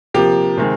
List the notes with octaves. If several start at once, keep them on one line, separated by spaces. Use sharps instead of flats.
C3 F3 A#3 G4
C3 D#3 G#3 C4